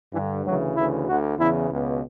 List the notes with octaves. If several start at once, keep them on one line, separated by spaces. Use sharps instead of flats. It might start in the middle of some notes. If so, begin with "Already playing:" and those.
G2 D3 E3
D2 C#3 E3 F#3
D2 C#3 E3 E4
D2 D3 F#4
E2 C#3 E3 E4
C#2 B2